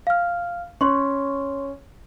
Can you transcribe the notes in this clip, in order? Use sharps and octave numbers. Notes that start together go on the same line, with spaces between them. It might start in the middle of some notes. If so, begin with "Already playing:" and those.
F5 F6
C#4 C#5 C6 C#6